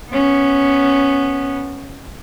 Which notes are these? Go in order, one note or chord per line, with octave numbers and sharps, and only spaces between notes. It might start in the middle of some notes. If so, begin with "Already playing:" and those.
B3 C#4